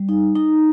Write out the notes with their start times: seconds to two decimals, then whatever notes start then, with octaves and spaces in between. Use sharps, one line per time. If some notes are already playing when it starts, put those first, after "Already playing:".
Already playing: G3
0.09 D#4
0.36 D#4